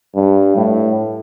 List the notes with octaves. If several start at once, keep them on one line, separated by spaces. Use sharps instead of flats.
G2
A2